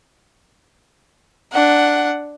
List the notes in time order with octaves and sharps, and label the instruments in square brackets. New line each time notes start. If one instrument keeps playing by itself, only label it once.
[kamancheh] D4 F#5